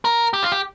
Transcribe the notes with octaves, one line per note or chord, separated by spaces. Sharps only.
A#4
G4
F4
G4